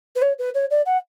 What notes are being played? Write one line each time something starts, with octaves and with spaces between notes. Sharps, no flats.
B4
C#5
B4
C#5
D5
F#5